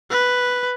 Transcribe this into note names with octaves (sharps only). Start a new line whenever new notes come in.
B4